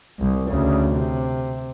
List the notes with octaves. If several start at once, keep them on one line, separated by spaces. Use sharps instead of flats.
C2
D2 C#3
C3